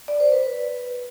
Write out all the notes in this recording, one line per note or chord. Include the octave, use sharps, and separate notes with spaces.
D5
C5
B4